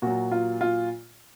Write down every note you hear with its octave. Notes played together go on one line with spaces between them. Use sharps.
A#2 F#3 F#4
F4
F4